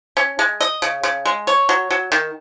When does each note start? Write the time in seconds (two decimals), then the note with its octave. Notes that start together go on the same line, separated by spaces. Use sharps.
0.17 C#4
0.39 G#3
0.61 D#5
0.82 C#3
1.03 C#3
1.26 G#3
1.47 C#5
1.69 F#3
1.91 F#3
2.12 D#3